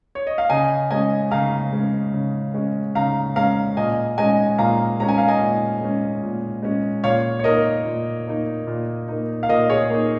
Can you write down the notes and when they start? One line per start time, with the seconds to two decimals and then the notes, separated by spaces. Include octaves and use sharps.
0.15 C#5
0.27 D#5
0.38 F5
0.50 C#3 D#5 G#5
0.91 G#3 C#4 D#5 G#5
1.31 C#3 F5 A#5
1.73 G#3 C#4
2.13 C#3
2.54 G#3 C#4
2.95 C#3 F5 A#5
3.36 G#3 C#4 F5 A#5
3.77 A#2 D#5 G#5
4.18 G#3 C#4 D#5 G#5
4.58 A#2 F5 A#5
5.00 G#3 C#4 A#5
5.08 G#5
5.18 F5
5.28 D#5 G#5
5.40 A#2
5.81 G#3 C#4
6.23 A#2
6.63 G#3 C#4
7.04 A#2 C#5 F5
7.39 C#5
7.44 A#3 D#4 A#4 D#5
7.85 A#2
8.27 A#3 D#4
8.67 A#2
9.08 A#3 D#4
9.43 F5
9.49 A#2 A#4 D#5
9.70 G#4 C#5
9.90 A#3 D#4